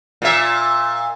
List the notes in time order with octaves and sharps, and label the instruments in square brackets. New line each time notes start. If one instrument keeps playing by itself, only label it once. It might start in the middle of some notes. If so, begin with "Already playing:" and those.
[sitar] A#2 E5